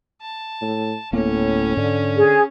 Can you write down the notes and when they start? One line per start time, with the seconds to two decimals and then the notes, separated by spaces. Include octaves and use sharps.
0.22 A5
0.61 A2
1.13 D1 A2 A#3 B3 C#4
1.77 G#2 D3
2.16 G#4